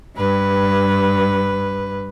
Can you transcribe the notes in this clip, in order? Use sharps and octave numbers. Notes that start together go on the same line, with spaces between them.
G2 B4